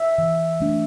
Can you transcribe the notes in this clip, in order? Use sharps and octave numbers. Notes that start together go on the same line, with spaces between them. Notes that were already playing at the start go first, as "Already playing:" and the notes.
Already playing: E5
E3
A3 D4